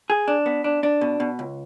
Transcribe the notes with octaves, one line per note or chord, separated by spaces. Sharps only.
G#4
D4
B3
D4
D4
B2
B2
C#2